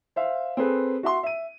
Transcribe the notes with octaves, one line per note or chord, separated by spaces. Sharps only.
C5 E5 F5
C4 G#4 A4 B4
F#4 E5 C6
E5 D#7